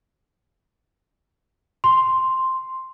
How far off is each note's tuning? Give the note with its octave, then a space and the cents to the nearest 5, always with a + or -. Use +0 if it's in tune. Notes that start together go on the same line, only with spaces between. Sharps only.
C6 +0